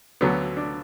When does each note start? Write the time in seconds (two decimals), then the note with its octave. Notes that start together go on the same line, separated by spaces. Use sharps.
0.21 D2 D3 F#3 B3
0.57 D4